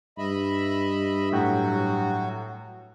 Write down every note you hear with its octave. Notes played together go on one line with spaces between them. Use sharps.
G2 D#5 E5 B5
A2 F#3 F#4 G5